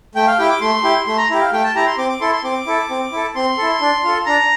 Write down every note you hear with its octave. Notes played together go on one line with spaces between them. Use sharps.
A3 G5
F5
E4 G4 G5
D6
A3 C6
E4 G4
A3 C6
A#5
E4 G4
F5
A3 G5
A5
E4 G4 A#5
C6
C4 D6
D6
E4 A4 C6
C6
C4 D6
E4 A4
C4
E4 A4
C4 C6
E4 A4
D4
F4 A4
D4 A#5